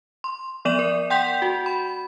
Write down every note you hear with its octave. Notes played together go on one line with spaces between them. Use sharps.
C6
F3 B3 D5 D#7 E7 F#7
A#4
F#5 G5 C6 G6 B6 F7
F#4
B5